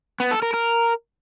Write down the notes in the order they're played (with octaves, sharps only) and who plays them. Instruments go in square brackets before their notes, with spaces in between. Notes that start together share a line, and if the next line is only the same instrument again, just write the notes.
[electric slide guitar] B3
A4
A#4
A#4